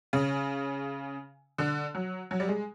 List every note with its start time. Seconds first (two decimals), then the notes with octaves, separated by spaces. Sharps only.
0.13 C#3
1.58 D3
1.95 F#3
2.31 F#3
2.40 G3
2.49 G#3